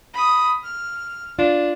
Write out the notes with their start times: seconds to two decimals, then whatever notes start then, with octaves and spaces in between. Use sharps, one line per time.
0.14 B5 D#6
0.64 F6
1.39 D4 F4